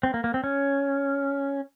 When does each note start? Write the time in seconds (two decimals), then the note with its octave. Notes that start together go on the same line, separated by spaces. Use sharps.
0.03 C4
0.14 A#3
0.24 A#3
0.34 C4
0.44 C#4